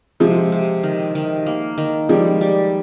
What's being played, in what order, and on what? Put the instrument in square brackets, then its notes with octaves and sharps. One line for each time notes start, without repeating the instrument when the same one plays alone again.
[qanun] C3 [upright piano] F3 G#3
[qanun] C3
D#3
D#3
A#3
D#3
[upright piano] F3 G#3 [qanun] G3
[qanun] G3